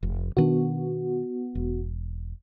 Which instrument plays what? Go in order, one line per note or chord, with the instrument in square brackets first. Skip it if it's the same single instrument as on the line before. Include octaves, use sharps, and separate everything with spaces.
[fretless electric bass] F1
[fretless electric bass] B2 D#3 D4 [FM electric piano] B3 F#4
[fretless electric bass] E1